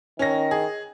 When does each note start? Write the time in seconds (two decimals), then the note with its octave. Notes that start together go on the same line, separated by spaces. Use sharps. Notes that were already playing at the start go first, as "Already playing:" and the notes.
0.19 D#3 C#4 A#6
0.51 G#4